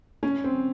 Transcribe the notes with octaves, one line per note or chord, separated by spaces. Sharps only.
C#4
C4